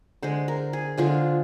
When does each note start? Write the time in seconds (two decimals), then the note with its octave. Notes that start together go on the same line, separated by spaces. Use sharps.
0.22 D3 G#3 C5
0.48 A#4
0.73 G#4
0.98 D3 F3 G#3 F4